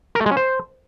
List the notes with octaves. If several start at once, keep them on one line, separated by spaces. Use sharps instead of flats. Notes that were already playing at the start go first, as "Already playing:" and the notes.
A#4
A3
G#3
C#4
C5